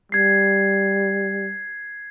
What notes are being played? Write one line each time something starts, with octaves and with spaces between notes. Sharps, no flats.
G3 G#6 C7